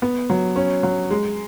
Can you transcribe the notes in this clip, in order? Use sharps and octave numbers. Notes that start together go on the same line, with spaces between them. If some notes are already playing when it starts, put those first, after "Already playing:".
B3
F#3
C#4
F#3
G#3